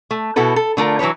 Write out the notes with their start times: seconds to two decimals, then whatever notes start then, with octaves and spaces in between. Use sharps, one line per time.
0.11 A3
0.36 B2 E4 F#4 A4 B4
0.56 A4
0.77 D3 A3 F4 A#4
0.99 E3 F#3 A3 B4 C#5